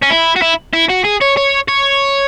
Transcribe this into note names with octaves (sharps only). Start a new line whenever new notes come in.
C#4
E4
F#4
E4
E4
F#4
G#4
C#5
C#5
C#5